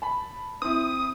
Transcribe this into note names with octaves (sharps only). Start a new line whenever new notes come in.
A5 B5
C4 E4 D#6